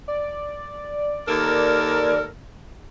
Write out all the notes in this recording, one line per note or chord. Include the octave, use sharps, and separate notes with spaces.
D5
D#2 A4 A#4